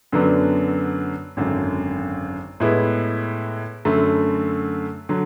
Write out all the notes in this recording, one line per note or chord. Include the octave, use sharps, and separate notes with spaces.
F#2 D3 F#3 B3 D4
G#1 F#2 D3
A2 G#3 B3 E4 B4
F#2 D3 A3
D3 F#3